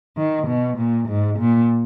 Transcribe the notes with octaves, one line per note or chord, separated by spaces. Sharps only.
D#3
B2
A#2
G#2
A#2